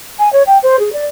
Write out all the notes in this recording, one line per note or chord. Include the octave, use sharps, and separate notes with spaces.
G#5
C#5
G5
C5
G#4
D5